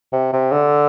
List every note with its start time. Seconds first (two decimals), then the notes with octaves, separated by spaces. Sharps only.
0.13 C3
0.33 C3
0.52 D3